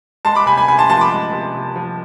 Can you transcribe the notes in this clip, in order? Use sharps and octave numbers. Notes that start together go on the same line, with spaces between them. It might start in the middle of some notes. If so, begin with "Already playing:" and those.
G#3 A5 C6
B5 D6
C3 G#5 B5
G#5 B5
C3 G#5 B5
A5 C6
F3 A5 C6
B5 D6
G#3
C3
C3
F3